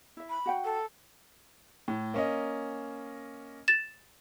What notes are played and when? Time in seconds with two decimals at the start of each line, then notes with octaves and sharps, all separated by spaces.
0.17 E4 E5
0.29 B5
0.46 F#4 F#5 G5
0.64 A4
1.88 A2
2.14 A#3 C#4 D#5
3.68 A6 E7